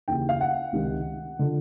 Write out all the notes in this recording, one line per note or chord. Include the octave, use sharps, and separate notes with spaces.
D#2 C#3 E3 G5
F5
F#5
C#2 C3 D#3
D3 F3